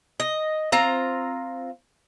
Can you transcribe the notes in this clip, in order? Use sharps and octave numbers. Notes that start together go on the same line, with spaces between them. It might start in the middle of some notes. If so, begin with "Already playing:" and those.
D#5
C4 F4 A#5